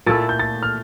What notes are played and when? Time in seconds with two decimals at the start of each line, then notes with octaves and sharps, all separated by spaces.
0.06 A#2 A3 E4 A4 A6
0.29 G6
0.39 A6
0.63 F6